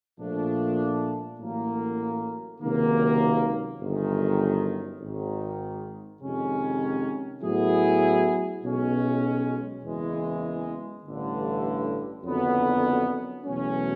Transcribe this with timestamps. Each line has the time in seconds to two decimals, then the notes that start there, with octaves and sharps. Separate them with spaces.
0.19 A#1 A#2 F3 A3 D4
1.39 A1 A2 F#3 A#3
2.60 C#2 C3 D#3 F#3 A#3
3.81 G1 F#2 D#3
5.01 G#1 G#2 D#3
6.21 F2 C3 D#3 G#3 C#4
7.42 A2 F#3 B3 E4 G#4
8.63 B1 B2 G#3 C#4
9.83 F#1 E2 C#3 E3 G#3
11.05 A1 G2 D3
12.24 F#1 F2 D3 F#3 B3
13.45 E2 B2 F#3 A3 C#4